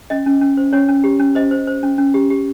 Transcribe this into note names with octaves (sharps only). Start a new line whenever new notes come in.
C#4 D#5
C#4
C#4
C5
C#4 C#5
C#4
G4
C#4
C5 D#5
C5
C5
C#4
C#4
G4
G4